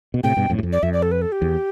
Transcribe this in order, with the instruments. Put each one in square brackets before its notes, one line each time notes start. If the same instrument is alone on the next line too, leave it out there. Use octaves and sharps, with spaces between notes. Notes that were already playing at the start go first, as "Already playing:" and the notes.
[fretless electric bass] B2
[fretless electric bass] A2 C3 [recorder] G5
[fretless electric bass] G2 B2
F2 A2
G2
F2
[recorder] D5
[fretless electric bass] F2 [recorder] E5
[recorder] D5
A4
B4
A4
G4
[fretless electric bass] E2